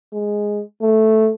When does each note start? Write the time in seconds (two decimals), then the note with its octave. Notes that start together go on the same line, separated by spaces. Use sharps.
0.13 G#3
0.82 A3